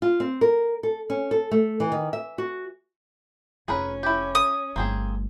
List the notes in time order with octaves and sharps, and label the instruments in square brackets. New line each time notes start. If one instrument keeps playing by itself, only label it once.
[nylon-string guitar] F4
C4
A#4
A4
C#4
A4
A3
E3
D#3
E5
F#4
[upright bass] F1 F4 [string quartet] C#4 [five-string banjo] G#4 A#4 B4
[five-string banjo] E4 G4
[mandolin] D#6
[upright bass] G1 A3 [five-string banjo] A#3 C4 G#4